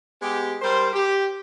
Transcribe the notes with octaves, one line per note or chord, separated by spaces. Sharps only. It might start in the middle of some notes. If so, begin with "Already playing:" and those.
G#3 B3 G4
G3 A#4 C5
G4